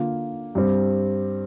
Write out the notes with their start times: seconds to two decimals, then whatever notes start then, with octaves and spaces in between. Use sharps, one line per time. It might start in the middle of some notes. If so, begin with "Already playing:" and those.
Already playing: D3 A#3 F4
0.55 G2 G3 C4